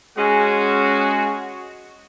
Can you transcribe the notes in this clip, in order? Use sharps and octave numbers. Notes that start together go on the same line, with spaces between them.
G#3 C#4 F#4